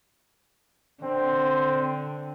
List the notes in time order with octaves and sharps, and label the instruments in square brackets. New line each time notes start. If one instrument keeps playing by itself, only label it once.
[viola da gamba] D3 [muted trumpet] C4